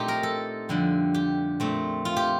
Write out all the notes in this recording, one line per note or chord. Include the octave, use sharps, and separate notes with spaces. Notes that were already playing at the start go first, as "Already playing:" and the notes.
Already playing: A#2 A3 C4 D#4 G4
A#4
A4
F2 D3 G3
G4
A#2 A3 C4
F4
G4